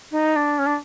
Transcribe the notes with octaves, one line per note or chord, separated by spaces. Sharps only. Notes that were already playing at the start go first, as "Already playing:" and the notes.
D#4
D4
C#4
D4